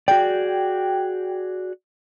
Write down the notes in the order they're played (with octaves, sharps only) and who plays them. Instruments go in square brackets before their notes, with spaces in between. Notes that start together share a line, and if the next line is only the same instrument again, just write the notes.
[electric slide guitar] F#4 G#4 D5 [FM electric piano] G5